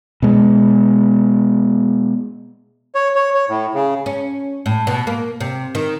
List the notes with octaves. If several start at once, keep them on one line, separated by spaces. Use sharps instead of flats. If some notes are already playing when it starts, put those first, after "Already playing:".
B2 G#3
C#5
C#5
C#5
A2
C#3
C#4
A2
B2
A#3
C3
D#3